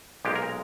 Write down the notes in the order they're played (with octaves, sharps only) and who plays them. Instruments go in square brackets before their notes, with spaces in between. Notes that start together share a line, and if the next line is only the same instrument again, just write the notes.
[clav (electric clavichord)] B1 A#2 G#3 G4
A#4